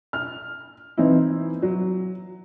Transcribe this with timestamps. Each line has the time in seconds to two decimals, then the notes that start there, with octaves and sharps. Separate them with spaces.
0.13 F6
0.97 E3 C4 D#4 E4
1.62 F#3